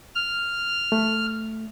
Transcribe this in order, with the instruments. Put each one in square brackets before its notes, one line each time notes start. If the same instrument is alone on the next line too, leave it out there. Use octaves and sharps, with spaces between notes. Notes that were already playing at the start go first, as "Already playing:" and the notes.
[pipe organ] F6
[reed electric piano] A3